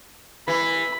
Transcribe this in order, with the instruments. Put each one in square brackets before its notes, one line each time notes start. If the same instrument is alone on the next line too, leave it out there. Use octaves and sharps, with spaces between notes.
[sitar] E3 [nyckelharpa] B5